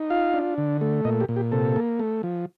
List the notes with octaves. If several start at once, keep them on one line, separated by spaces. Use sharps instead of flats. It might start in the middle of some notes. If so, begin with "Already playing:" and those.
Already playing: D#4
F4 F5
D4
D3
A3
A#2 D#5
G4
A#2
G4
C3 A4
A#3
A3
F3